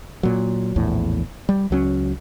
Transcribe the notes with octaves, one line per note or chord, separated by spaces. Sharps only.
A#2 F#3
A#1 E2 A2
G3
C#2 F#3 C#4